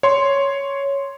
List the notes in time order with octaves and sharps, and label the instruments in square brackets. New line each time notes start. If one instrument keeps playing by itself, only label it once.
[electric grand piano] C#5 C6